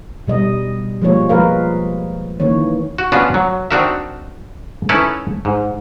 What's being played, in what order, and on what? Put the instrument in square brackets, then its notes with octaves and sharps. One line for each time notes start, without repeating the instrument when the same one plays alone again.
[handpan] B2 G3 D#5
F3 G3 G#3 A#3 F4 C#5
F3 G#3 F4 A#4 B4 F5
D#3 E3 A#3 C#5
[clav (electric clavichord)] F#4
B3 C#4 D4 F4 F#4
F#3
C4 D4 D#4 F#4 A#4 E5
C#4 D#4 E4 A4 B4 C#5
G#2